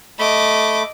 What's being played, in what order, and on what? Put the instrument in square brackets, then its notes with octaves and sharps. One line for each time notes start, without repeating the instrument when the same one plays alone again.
[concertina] A3 B5 [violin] D#5 D6